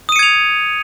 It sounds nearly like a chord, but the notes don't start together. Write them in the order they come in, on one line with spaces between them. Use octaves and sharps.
D#6 D#7 C#7 G#6 F7